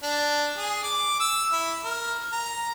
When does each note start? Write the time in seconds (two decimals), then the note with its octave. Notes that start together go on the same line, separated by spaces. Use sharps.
0.03 D4
0.57 G#4
0.83 D6
1.20 E6
1.52 E4
1.84 A#4
2.32 A#5